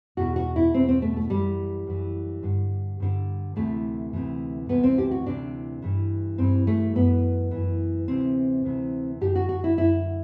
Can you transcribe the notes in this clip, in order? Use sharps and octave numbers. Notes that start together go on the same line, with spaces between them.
E2 B2 F#4
F#4
E4
E2 B2 C4
C4
A3
A3
F#2 E3 G3
F#2 E3
G2 D3
G2 D3
D2 C3 E3 A3
D2 C3 E3
D2 C3 E3 B3
C4
G4
F#4
D2 C3 E3 D4
G2 E3
G2 E3 C4
A3
F#2 E3 B3
F#2 E3
D2 C3 E3 C4
D2 C3 E3
F#2 D3 G4
F#4
F#4
E4
F#2 D3 E4